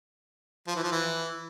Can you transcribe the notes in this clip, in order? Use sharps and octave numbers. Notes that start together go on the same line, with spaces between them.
F3
E3
F3
E3